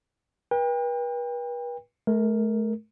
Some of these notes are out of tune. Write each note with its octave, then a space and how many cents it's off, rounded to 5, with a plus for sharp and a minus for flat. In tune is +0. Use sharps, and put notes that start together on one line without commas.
B4 -40 G5 +30
A3 -35 A#4 +0